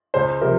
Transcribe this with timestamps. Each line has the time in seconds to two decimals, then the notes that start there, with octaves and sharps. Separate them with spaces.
0.14 C#2 C5
0.41 C3 F3 A#4